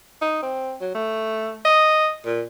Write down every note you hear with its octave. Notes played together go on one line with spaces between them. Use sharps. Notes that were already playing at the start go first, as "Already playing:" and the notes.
D#4
C4
F#3
A3
D#5
A#2